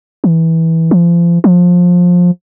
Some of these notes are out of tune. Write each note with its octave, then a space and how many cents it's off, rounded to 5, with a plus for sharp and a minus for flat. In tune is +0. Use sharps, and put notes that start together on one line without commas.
E3 -15
F3 -35
F3 +20